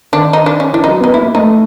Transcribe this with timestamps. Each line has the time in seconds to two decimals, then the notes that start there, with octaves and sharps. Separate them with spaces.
0.13 D#3 D4
0.33 D#4
0.46 D4
0.60 C#4
0.73 E3 D4
0.84 F#3 D#4
1.00 B3 D#4
1.14 A#3 E4
1.34 A3 D#4